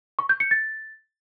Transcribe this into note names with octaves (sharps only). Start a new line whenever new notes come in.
C#6
G6
C#7
A6